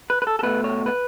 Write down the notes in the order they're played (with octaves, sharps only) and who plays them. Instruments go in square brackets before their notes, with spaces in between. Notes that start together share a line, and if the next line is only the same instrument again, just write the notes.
[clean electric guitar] B4
B4
A4
A4
B2 A3 B4
C#5
B4